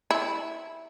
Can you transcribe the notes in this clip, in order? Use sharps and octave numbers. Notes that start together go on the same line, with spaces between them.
E4